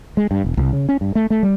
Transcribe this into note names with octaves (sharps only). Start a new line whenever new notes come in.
G#3
G2
E1
C2
C#3
C#4
G2
A3
A3
G3